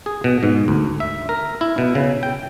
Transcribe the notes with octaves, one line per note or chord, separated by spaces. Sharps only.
G#4
B2
G#2
D2
E5
A#4
E4
B2
C#3
G5